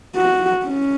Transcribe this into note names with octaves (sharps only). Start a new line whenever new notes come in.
F#4
C#4